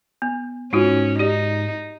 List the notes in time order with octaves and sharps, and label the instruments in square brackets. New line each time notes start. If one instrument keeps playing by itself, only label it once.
[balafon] B3
[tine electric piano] G#2 [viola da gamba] C#4 [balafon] D#4 F4 F#4
[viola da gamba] D#4 [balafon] G4 D5